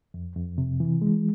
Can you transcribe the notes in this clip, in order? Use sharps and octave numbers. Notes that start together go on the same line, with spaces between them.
F2
F2
C3
E3
G#3